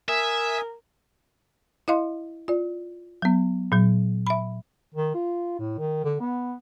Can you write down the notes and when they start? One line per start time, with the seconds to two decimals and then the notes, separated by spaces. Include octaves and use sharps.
0.09 A#4 E5 G#5 D#6
1.88 E4 D#5 F5 C6
2.48 F4 D5
3.22 F#3 B3
3.72 A#2 F#3
4.27 E5 B5
4.95 D#3
5.14 F4
5.59 A2
5.78 D#3
6.04 D3
6.20 B3